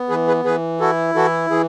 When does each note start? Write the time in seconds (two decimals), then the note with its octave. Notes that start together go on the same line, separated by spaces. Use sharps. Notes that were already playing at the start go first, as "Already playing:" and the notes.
Already playing: B3
0.09 E3 G#4 B4
0.27 G#4 B4
0.44 E3 G#4 B4
0.80 E4 F#4 A4
1.15 E3 F#4 A4
1.50 E3 G#4